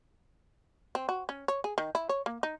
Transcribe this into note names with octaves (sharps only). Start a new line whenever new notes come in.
C4
F#4
C#4
C#5
G#4
D#3
E4
C#5
A#3
D#4